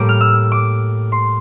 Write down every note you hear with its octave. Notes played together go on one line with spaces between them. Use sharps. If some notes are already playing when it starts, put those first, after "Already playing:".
Already playing: A2 G3 A#3 D6
F6
E6
D6
C6